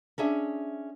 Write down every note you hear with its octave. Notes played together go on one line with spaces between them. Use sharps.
C#4 D4 G#4 E5